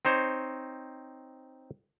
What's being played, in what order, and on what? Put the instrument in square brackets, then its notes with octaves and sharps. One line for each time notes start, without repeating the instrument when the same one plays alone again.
[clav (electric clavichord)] C4 D#4 C5 C#5